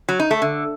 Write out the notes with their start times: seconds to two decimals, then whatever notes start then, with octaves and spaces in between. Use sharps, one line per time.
0.09 F#3
0.20 D#4
0.31 A3
0.42 D3